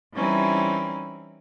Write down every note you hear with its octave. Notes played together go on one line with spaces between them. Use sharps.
E3 G3 C4 C#4 D#4 E4